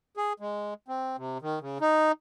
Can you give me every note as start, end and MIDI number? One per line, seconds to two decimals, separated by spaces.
0.17 0.33 68
0.40 0.74 56
0.88 1.17 60
1.17 1.38 48
1.42 1.59 51
1.61 1.78 49
1.81 2.12 63